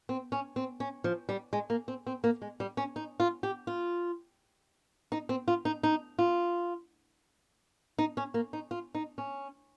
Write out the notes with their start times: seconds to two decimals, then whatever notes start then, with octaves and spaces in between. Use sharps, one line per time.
0.09 C4
0.32 C#4
0.56 C4
0.80 C#4
1.04 F3
1.29 G3
1.53 G#3
1.70 A#3
1.88 C4
2.07 C4
2.24 A#3
2.42 G#3
2.60 G3
2.77 C#4
2.96 D#4
3.20 F4
3.43 G4
3.67 F4
5.12 D#4
5.29 C4
5.48 F4
5.65 D#4
5.83 D#4
6.19 F4
7.99 D#4
8.17 C#4
8.34 A#3
8.53 D#4
8.71 F4
8.95 D#4
9.18 C#4